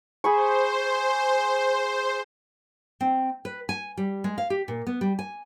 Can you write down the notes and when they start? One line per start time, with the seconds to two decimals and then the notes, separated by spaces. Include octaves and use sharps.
0.24 G#4 C5 B5 C#6
3.01 C4
3.45 B4
3.69 G#5
3.97 G3
4.24 G#3
4.38 F5
4.50 G4
4.68 A#2
4.87 B3
5.01 G3
5.19 G#5